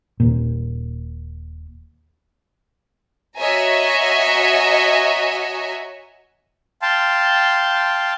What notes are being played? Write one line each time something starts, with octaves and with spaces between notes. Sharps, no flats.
D#1 D#2 A#2
F#4 C#5 D#5 E5 G#5 A#5
F5 G5 A5 C6